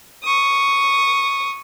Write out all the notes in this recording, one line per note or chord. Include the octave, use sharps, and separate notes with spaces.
C#6 D#6